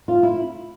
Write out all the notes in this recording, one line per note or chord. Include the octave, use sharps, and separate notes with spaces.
F4
E4